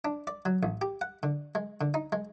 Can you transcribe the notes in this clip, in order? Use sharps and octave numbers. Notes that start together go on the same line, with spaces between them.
D4
D5
F#3
A1
G4
F#5
D3
G#3
D3
D#4
G#3